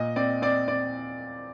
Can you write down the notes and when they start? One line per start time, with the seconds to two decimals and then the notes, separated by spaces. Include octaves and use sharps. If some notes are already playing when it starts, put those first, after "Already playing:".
Already playing: A#2 D#5
0.16 C4 D5
0.42 C4 D5
0.68 C4 D5